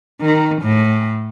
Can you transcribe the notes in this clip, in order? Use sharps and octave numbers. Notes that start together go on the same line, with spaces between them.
D#3
A2